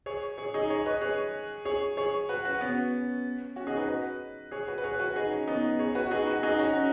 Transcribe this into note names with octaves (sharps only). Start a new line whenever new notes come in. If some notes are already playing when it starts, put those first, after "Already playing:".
G#4 C#5
G#4 C#5
D#4 G#4
G#4 C#5
B4 D#5
G#4 C#5
G#4 C#5
G#4 C#5
F#4 B4
C#4 F#4
C#4
B3
C#4
C#4 F#4
D#4 G#4
F#4 B4
B4 D#5
G#4 C#5
F#4 B4
B4
G#4 C#5
F#4 B4
D#4 G#4
C#4
B3 D#4
G#4 C#5
F#4 B4
F#4
D#4 G#4
F#4 B4
D#4 G#4
C#4 F#4
C#4